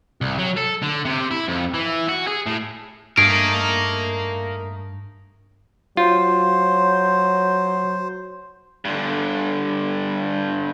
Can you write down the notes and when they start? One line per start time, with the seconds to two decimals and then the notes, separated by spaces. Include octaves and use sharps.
0.21 C2
0.39 F#3
0.57 A4
0.83 D3
1.05 C3
1.31 E4
1.48 F2
1.74 E3
2.09 F#4
2.27 G#4
2.47 A2
3.17 G2 A3 D#4 G#4 A#4 F5 D7
5.97 F#3 F4 C5
8.85 G2 D3